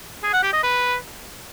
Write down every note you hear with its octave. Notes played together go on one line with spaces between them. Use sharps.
G#4
F#5
G4
D#5
B4